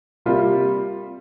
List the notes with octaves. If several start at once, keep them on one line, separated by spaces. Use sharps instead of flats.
C3 G3 A#3 F4